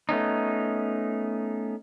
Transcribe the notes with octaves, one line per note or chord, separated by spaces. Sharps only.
A3 B3 C#4 D#4